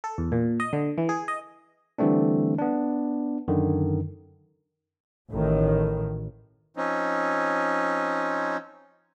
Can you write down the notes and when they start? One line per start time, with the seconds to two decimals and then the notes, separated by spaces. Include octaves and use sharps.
0.04 A4
0.18 E2
0.32 A#2
0.60 D#5
0.73 D3
0.98 E3
1.09 G#4
1.28 D#5
1.98 D3 E3 G3 A3 C4 D4
2.58 B3 D4
3.48 F#2 D3 D#3
5.32 A1 A2 D#3
6.77 F3 C4 C#4 D#4